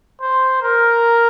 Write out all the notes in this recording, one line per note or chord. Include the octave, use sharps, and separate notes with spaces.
C5
A#4